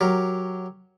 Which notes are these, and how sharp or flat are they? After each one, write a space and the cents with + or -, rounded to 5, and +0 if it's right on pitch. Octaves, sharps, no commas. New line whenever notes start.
F#3 +0 G4 +0 A#4 +0